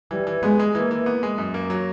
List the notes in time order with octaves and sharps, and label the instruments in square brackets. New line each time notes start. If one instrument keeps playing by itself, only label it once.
[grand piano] E3 [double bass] G3
[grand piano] E3
[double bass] G#3 [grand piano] B3
[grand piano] G#3
[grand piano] E3 [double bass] A#3
[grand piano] E3
B3
G#3
F#2
A#3
F#3